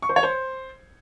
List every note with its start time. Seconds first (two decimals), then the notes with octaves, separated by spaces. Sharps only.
0.02 C#6
0.09 C5
0.16 C#5
0.23 C5